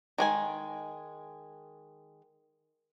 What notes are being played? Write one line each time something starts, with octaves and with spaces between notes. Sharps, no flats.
D#3 G#3 G#5